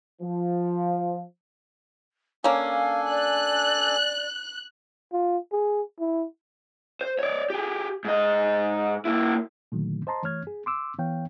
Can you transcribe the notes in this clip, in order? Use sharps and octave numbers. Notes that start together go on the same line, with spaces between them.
F3
A#3 C#4 D4 A4 F5 G#5
D5 F#6
F4
G#4
E4
C5
C#5 D5
G4 G#4
G#2 D#5
A#3 E4
A#2 D3 D#3 F#3 A3
C5 D#5 A5 A#5 C6
E3 A3 C#5 F6 G#6
G#4
C6 D6 E6
E3 B3 C#5 F5 G5